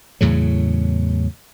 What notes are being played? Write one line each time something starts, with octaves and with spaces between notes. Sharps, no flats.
E2 A2 C#3 F#3